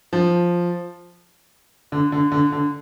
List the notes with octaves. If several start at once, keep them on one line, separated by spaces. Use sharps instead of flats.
F3
D3
D3
D3
D3